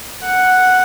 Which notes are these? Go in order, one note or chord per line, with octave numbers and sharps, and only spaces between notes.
F#5